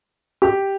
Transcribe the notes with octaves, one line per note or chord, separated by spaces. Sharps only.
G4